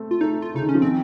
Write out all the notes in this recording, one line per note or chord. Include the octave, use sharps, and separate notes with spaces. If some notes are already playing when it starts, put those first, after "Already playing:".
Already playing: A3 C4
F4
A3 D#4
F4
C#3 D#4
D#3
C#4
F3
D#3 C4